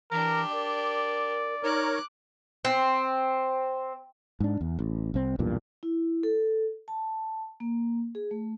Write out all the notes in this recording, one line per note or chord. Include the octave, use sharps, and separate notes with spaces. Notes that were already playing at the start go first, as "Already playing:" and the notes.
E3 D4 G4 A#4
A#4 D5
D#4 A#4 C#5 D6 F#6
C4
G#2 D4
E2
A1
C2 C4
B1 E2 G2 A#2
E4
A4
A5
A#3
G#4
A3